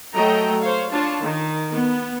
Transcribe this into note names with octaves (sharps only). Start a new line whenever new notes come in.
F#3 A3 A4 D#5 G5 A#5
C5 C#5 F5
D4 F4 C#5 A5
D#3
B3